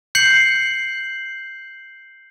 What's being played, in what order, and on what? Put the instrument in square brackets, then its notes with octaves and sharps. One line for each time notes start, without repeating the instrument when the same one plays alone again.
[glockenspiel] G6 C7 C#7 F#7